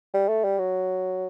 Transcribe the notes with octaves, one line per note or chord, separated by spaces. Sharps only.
G3
A3
G3
F#3